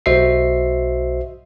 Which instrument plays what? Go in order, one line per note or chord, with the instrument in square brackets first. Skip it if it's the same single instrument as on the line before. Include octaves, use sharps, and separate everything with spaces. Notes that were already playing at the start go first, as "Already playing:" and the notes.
[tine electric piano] B1 F#4 C5 D#5 E5 C7